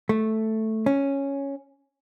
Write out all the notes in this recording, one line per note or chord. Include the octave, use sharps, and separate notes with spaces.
A3
C#4